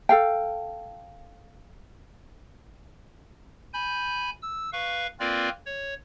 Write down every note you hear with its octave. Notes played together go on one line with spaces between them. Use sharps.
A4 F5 G5
G#5 B5 G6
E6
B4 F5 C#6
A#3 C4 F4 A#4 B4 D5
C#5